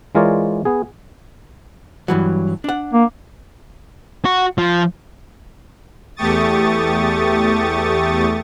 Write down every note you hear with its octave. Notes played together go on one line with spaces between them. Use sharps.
E3 G#3 F4 A#4 C#5 D5
B3 G#4
G2 E3 F#3
D4 F#5
A#3
F#4
F3
E2 A3 G4 C#6 D#6 A6